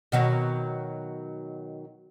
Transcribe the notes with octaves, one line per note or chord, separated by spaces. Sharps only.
B2 D#3 F#3